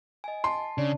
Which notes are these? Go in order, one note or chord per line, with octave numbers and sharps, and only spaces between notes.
D#5 G#5
A5 C6
C#3 D4